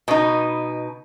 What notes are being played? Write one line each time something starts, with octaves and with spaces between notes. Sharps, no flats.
B2 D#4